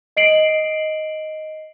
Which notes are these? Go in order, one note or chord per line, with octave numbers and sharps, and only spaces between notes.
D#5 C7 D7 F#7